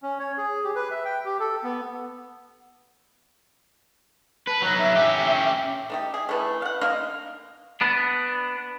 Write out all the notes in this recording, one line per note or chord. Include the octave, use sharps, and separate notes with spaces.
C#4
C#5
G#4
G4
B4
E5
G5
G4
A4
B3
B4 A5
F#3 D#4 F#6
E5
C#4 G4
A3 D#4 G4
G#4
E3 A3
F5 F#5
D3 A#3 D#4 A#4
B3 D4